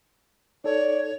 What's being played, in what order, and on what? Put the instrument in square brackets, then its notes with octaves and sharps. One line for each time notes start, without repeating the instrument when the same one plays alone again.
[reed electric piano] D#4 A4 [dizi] C#5 [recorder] D5